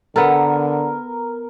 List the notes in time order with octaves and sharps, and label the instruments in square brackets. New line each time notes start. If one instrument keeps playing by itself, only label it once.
[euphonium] D3 [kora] B3 A4 [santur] A#4